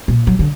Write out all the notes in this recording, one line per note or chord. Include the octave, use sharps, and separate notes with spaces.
A#2
F#3
D3